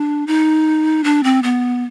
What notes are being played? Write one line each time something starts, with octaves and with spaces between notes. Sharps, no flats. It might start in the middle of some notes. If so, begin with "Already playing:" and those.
Already playing: D4
D#4
D4
C4
B3